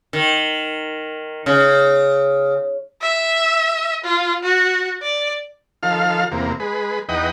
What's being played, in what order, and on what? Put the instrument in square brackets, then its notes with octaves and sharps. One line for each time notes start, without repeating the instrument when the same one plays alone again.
[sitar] D#3
C#3
[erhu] E5
F4
F#4
D5
[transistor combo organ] D#3 F3 A4 F5 F6
E2 C3 A#3
G#3 B4
E2 D#4 B4 D#5 F#5 G5